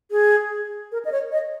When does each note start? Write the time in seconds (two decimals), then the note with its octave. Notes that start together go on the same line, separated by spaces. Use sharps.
0.11 G#4
0.92 A#4
1.05 D#5
1.12 C#5
1.32 D#5